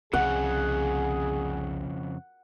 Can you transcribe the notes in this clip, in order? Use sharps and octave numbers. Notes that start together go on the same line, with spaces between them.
C2 F2 C#3 G#4 F#5